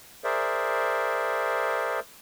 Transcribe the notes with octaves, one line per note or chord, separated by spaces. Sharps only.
G#4 A#4 C5 D5 E5